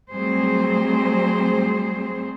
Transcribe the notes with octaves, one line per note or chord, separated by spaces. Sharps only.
F#3 G3 A3 C4 G#4 C5